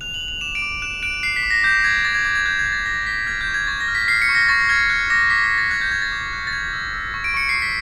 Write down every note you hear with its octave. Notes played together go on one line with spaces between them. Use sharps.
F#6 F7
F#7
F#6
F7
D6 E7
D7
D6
F#6 E7
F#6 D7
F#6 C7
B6
D6
A#6
D6 G6
D6 G#6
D6 A6
G#6
D6 G#6
G#6
F#6 G6
G#6
F#6
A6
F#6 A#6
A#6
F#6 B6
F6 G#6
G6
C#6
G#6
C#6 A6
A#6
F6
B6
F6 C7
C#7
C#6
A#6
C#6 A6
F6 G#6
F#6
D6 A#6
D6 B6
A#6
D6
A6
F#6 G#6
G6
D6 G#6
A6
D6
F#6
A6
C#6 G#6
E6
E6
C#6
D7
C#6 C#7
C7
C#6
B6